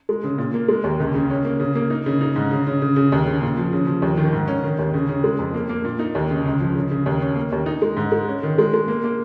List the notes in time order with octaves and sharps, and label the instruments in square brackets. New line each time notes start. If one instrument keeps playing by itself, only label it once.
[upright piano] G#3
C#3
A#2
A#3
G#3
D#2
C#2
C#3
C#4
A#3
C#3
A#3
D#4
C#3
D#4
G#2
C#3
C#3
C#3
C#3
D#2
C#3
A#2
F3
C#3
F3
D#2
D#3
G#2
C#4
D#3
D#2
C#3
C#3
G#3
F2
A#3
A#3
A#2
D#4
D#2
C#3
C#2
F3
C#3
C#3
D#2
C#4
A#3
D#2
D#4
G#3
G#2
G#3
C#4
D#3
G#3
G#3
A#3
A#3